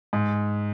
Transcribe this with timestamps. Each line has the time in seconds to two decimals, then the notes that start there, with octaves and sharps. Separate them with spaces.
0.13 G#2